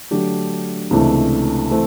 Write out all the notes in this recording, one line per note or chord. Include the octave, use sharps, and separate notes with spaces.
D3 F#3 A3 D4 G4
C#2 C3 E3 A3 D4
E3 A3 C4